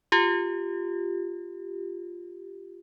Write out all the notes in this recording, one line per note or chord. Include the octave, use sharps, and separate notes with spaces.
F4 G4